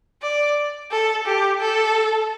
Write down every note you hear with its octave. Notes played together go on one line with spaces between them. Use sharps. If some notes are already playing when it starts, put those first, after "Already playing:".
D5
A4
G4
A4